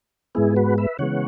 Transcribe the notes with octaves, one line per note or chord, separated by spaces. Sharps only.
G#2 G#3 B3 E4 G#4
F#4 B4
B4 E5
C#3 E3 G#3 B3 C#5 F#5